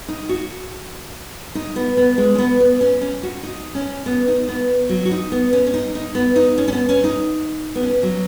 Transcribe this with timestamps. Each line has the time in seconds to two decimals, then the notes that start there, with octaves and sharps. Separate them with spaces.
0.08 D#4
0.29 F#4
1.55 D#4
1.76 B3
1.97 B3
2.18 G#3
2.35 C#4
2.38 B3
2.60 B3
2.81 C#4
3.01 C#4
3.23 F#4
3.43 D#4
3.75 C#4
4.06 B3
4.28 D#4
4.48 B3
4.89 F#3
5.05 F#4
5.11 D#4
5.32 B3
5.53 C#4
5.67 C#4
5.74 D#4
5.95 D#4
6.15 B3
6.36 D#4
6.58 C#4
6.68 C#4
6.73 B3
6.89 C#4
7.04 D#4
7.75 B3
7.83 C#4
8.03 F#3